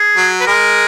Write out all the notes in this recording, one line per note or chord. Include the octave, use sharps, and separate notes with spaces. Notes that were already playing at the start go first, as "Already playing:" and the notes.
Already playing: G#4
F#3
B4
G#3 A#4